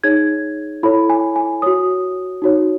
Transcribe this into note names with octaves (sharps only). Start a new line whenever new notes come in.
D#4 G#4 C#5 G#6
E4 A4 C#5 B5
G#5
G#5
F#4 C#5 D#6
D#4 F#4 C#5